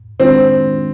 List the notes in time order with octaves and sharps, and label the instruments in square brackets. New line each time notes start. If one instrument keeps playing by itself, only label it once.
[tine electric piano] D#3 G#3 D4 F4 C5 [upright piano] C4